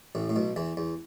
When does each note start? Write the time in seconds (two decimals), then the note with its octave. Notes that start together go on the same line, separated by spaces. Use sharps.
0.15 A1 A2
0.30 A2
0.36 B1 B2
0.56 E2 E3
0.77 E2